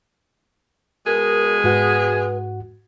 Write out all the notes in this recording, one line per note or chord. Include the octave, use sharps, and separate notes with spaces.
B2 G#3 G#4 A#4
G#2 F#4 B4 F#5